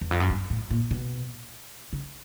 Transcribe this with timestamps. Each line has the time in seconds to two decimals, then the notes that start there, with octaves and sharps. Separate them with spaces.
0.01 E2
0.11 F2
0.20 F#2
0.30 G2
0.50 A2
0.71 A#2
0.91 B2
1.93 C#3